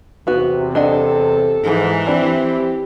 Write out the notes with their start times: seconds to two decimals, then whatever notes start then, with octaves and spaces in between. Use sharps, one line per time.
0.27 E2 C3 B3 F#4
0.75 D4 A4 D#5 F#5
1.64 G#2 E3
2.07 C4 D4 E4 G4